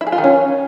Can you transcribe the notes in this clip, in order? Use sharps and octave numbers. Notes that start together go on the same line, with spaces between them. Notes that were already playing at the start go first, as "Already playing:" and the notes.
E4
G#4
F4
D#3
C#4